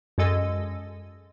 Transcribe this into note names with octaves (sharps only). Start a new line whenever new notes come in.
F#2 G#3 A4 D#5 E6